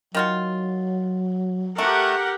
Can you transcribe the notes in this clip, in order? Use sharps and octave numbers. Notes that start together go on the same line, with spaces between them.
D#3 F#3 F4 F#4
A3 G4 A#4 F#5